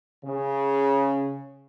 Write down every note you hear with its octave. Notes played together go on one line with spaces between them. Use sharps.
C#3